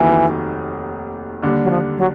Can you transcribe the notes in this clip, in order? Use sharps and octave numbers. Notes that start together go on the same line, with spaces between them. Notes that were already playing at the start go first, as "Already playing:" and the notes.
Already playing: F1 D#2 D#3 E3 F#3
D#2 D3 G3
F#3
F3
F#3